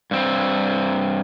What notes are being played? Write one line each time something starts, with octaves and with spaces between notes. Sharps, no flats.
G2 C4